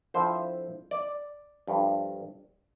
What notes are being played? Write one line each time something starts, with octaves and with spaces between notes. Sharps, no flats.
D3 F3 C4 E4 C5
D5
G2 F3 A3